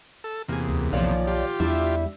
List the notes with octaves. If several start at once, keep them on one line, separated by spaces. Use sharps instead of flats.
A4
E2 C3 A#3 G#4
D2
B1 A#2 D#3 F3 C#5 D5 F5
F4 G4
E2 G3 D4 E4 E5